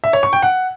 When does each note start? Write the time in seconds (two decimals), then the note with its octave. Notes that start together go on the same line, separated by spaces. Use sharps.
0.04 E5
0.13 C#5
0.23 C#6
0.33 G5
0.42 F#5